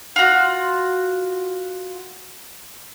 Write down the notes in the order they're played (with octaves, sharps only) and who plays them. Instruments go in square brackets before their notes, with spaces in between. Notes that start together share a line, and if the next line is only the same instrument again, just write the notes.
[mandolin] F4 F#4